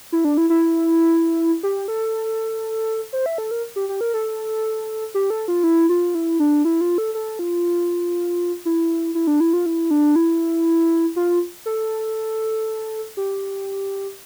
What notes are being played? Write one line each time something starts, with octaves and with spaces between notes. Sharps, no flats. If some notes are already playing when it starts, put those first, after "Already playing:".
E4
D4
E4
E4
G4
A4
C5
E5
A4
A#4
G4
G4
A#4
A4
G4
A4
F4
E4
F4
E4
D4
E4
F4
A4
A4
F4
E4
E4
D4
E4
F4
E4
D4
E4
F4
A4
G4